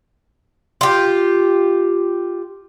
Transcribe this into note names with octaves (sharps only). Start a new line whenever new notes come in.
F4 G4